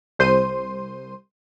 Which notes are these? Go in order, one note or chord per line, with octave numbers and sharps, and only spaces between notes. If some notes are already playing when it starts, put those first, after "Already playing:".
C2 C5 C6 C7 D#7